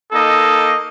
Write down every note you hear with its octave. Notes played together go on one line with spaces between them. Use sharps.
A#3 D#4 A4 D#5